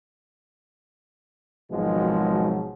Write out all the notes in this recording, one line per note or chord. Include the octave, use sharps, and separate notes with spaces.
G#1 B2 F3 F#3 G#3